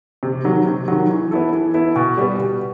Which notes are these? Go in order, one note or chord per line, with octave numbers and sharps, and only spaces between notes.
C3
D#3 F#3
C3
D#3 F#3
E3
B3 E4 A4
E3
B3 E4 A4
B2
G3 B3
B2